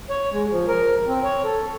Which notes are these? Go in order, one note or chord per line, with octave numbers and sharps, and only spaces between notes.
C#5
G#3
F3
A#4
C4
C#5
A4